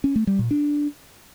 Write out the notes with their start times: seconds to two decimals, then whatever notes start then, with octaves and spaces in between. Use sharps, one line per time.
0.04 C#4
0.16 A3
0.27 G3
0.39 A#2
0.51 D4